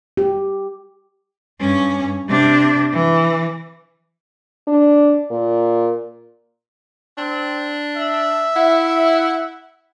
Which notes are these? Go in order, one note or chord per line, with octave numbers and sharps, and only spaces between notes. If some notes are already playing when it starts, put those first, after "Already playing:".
G4
G2 C#4
C3 D4
E3
D4
A#2
C4 D4
E5
E4 F#5